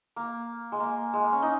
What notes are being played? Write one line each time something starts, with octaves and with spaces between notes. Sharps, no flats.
A#3
G#3
A#3
G#3
A#3
C#4
D#4